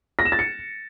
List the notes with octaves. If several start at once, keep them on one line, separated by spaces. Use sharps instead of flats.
A#6
E7
A6
C#7